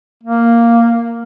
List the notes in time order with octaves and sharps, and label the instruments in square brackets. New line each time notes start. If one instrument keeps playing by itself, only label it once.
[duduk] A#3